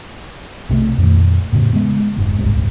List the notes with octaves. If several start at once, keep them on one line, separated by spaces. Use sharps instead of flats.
B1 C3 E3 A3
F2 A#2 D#3
A2 C#3
G#3 B3
F1 G#2
D1 G1 C2 C3